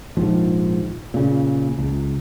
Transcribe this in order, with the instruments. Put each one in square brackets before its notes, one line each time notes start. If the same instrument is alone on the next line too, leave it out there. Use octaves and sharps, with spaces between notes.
[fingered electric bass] A#1 D#2 G#2 F3
A#2 C#3
C#2